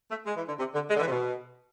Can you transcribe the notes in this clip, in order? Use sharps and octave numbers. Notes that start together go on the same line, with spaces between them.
A3
G#3
E3
D3
C3
D3
G#3
D3
E3
C3
B2